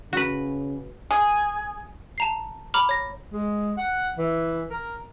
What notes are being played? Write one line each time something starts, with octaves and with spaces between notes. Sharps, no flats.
C#3 F#4 B4
G#4
A5 A#5 C7
A#5 B5 D6 F6
C#5 A#6
G#3
F#5
E3
A#4